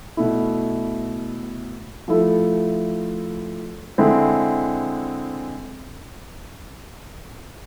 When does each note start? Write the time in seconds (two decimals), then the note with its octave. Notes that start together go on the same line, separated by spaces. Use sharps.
0.17 B2 A3 E4
2.08 F3 A3 E4 A4
3.98 D3 G#3 C4 E4